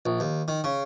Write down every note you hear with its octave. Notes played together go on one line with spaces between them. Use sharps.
A#1
D#2
D#3
C#3